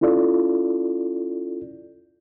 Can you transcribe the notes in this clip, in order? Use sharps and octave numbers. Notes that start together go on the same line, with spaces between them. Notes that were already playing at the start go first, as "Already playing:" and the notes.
C#4 E4 F4 A4 D5